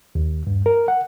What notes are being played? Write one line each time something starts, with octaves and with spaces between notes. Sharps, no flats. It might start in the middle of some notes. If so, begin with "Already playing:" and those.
D#2
G2
A#4
F#5